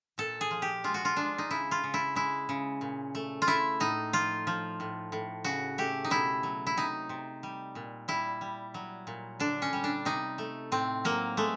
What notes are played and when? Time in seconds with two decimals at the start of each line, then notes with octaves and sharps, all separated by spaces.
0.18 A#2 A4
0.41 G#4
0.51 F3
0.62 G4
0.84 G#3 F4
0.94 F#4
1.05 F4
1.17 G#3 D4
1.38 D#4
1.50 C#3 E4
1.71 F4
1.83 C#3
1.94 E4
2.15 G#3 E4
2.49 C#3
2.81 A#2
3.15 A3
3.42 F4
3.47 A3 E4
3.80 A2 D#4
4.13 F3 F4
4.47 F3
4.80 A2
5.12 A2
5.44 C#3 F#4
5.78 A3 G4
6.04 D#4
6.10 B2 E4
6.43 F#3
6.67 E4
6.77 C3 D#4
7.09 C3
7.43 G3
7.75 A#2
8.08 G3 E4
8.41 G3
8.74 F#3
9.07 A#2
9.40 D3 D4
9.62 C#4
9.73 G3
9.84 D4
10.05 C3 D#4
10.38 A3
10.72 A2 C4
11.05 F#3 A#3
11.37 G#3 A3